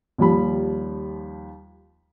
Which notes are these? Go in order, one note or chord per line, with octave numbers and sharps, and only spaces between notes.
D#2 F3 G3 B5